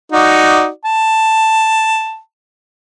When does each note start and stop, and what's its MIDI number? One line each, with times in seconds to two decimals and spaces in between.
0.12 0.69 63
0.12 0.69 66
0.12 0.69 74
0.85 2.19 81